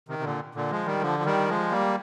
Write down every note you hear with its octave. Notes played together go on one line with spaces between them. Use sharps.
C3 D#3
C3
A#2 D3
A#2 D3
F3 G#3
D#3 G3
D3 F3
F3
D#3 G3
F3 G#3
G3 A#3